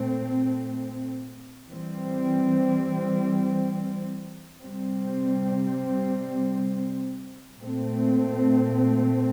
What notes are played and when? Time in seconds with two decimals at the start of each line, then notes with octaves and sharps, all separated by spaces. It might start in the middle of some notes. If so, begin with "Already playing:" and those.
Already playing: A#2 A3 C4
1.68 E3 G3 C4
4.62 C3 G3 C4
7.58 A#2 A3 C4